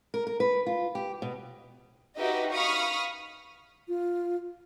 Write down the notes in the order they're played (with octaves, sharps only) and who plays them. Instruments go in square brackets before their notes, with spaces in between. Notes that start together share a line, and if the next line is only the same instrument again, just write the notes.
[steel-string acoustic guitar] A#4
A#4
B4
F4
G4
B2
[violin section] D#4 F#4 G4 B4 D#5 E5
F5 B5 C#6 D#6 F6
[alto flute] F4